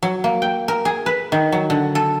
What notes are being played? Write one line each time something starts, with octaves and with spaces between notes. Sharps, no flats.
F#3
A#3
G5
A#4
G#4
B4
D#3
F#3
D3
A4